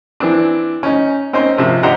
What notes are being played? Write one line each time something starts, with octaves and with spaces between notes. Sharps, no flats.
E3 C4 D4
C#4 D#4
C4 C#4 D#4 C5
A#1 C3 F3
D4 G4 C5 D#5 F#5 A#5